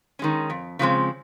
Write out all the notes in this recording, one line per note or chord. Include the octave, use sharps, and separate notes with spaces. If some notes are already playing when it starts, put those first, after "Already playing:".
D#3 G#3 C#4
F2
C#3 F3 G#3 C4